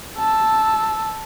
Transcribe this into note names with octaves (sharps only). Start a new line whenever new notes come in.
A5 E6